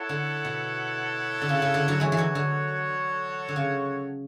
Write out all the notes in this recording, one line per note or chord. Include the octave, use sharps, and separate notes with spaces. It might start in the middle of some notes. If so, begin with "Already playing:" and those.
Already playing: E4 A4 C#5 F#5
D3
B2
D3
C#3
C#3
D3
D3 F#3
E3 G#3 F#4 A4 C#5 F#5
E3
D3 F#3
D3
D3
C#3